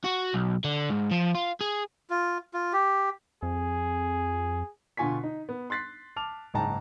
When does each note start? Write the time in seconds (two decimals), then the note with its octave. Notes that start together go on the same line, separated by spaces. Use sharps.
0.06 F#4
0.35 B1
0.64 D3
0.90 G#2
1.11 F3
1.35 F4
1.61 G#4
2.10 F4
2.54 F4
2.73 G4
3.43 F2 G#4
4.97 B2 D3 F4 G#5 C#6 B6
5.24 D#4
5.49 B3
5.70 C6 F#6 A6 B6 C7
6.16 A5 D6 F6 F7
6.54 F#1 G#2 D#4 G5 A5 A#5